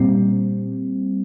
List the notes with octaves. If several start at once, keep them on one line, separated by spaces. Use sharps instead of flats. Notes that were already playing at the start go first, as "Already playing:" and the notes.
Already playing: A#2 G3 C4